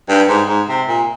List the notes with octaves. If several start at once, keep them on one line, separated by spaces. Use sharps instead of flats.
G2
G#2
G#2
C3
A#2